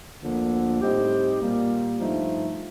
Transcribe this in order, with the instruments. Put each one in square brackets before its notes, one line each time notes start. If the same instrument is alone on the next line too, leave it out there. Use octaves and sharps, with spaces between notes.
[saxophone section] D2 D3 F3 A#3
A2 G3 C4 D#4 G4
A#2 G3 A#3
G2 F3 A3 D#4